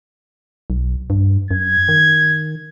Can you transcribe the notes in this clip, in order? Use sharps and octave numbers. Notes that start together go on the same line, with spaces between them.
B1
G2
F#2 G#6
D#3